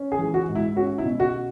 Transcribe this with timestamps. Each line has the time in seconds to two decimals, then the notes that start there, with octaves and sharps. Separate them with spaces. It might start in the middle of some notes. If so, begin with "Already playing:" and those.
Already playing: C#4
0.12 G#4
0.19 E3
0.34 F#4
0.48 G#2
0.55 E4
0.76 C#4 F#4
0.98 E4
1.05 B2
1.20 F#4